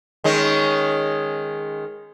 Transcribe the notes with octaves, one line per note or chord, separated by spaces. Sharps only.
D#3 G#3 C#4